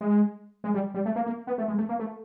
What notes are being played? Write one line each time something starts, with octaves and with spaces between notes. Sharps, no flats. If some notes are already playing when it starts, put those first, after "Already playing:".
G#3
G#3
G3
G3
A3
A#3
A#3
B3
A3
G#3
A3
A#3
A3